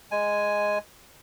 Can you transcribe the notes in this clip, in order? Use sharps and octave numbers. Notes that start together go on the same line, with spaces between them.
G#3 G#5